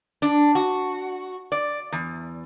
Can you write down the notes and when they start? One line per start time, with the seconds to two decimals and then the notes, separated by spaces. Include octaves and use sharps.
0.22 D4
0.55 F#4
1.52 D5
1.92 E2